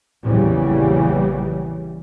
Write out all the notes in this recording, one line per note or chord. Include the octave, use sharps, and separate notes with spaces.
A#1 E2 C#3 E3 G3